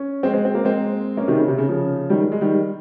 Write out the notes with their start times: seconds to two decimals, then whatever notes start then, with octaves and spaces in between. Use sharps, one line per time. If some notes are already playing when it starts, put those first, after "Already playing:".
Already playing: C#4
0.23 G#3 C4
0.33 G#3 C4
0.45 C4
0.54 A#3
0.65 G#3 C4
1.17 A#3 C#4
1.28 C3 D#3
1.37 C#3
1.48 C3
1.58 C#3
1.68 C#3 F3
2.10 D#3 G3
2.32 G#3
2.41 D#3 G3